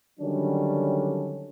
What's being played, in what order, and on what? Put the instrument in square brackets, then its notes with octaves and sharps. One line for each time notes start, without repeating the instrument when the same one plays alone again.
[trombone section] D3 D#3 F#3 G3 C#4 D4